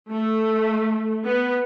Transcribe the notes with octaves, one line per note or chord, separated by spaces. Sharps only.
A3
B3